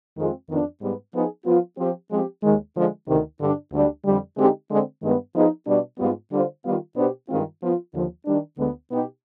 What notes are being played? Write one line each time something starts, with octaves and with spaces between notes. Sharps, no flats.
F2 D#3 G#3 C4 F4
F2 D#3 B3 D4 F4
G#2 G3 B3
F3 B3 D#4 G#4
F3 B3 F4
F3 C4 G4
F3 G#3 C4 G4
D#2 D#3 G#3
D3 F3 G#3
D2 C3 D#3
G2 D3 G3 D4
D2 D3 G3 D4
F2 D3 G3
D3 G#3 C4 D#4 G4
D3 G#3 C4
G2 D#3 G#3 B3
F3 B3 D#4 G#4
B2 G3 D4
G#2 G3 B3 F4
D3 G3 D4 F4 C5
D#3 G3 B3 F4
B2 B3 D4 G4 C5
G2 D#3 G#3 C4 F4
F3 B3 F4
D#2 D3 F3
D#3 G3 D4
D2 D3 G#3 B3
B2 B3 D#4 G4